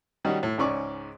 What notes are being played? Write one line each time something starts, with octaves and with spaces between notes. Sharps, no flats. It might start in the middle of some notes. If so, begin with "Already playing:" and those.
D#3 G3 C#4 D#4 F#4
A2
C#2 G#2 C#4 D5 C#6 D6